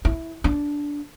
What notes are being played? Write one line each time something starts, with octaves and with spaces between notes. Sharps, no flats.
E4
D4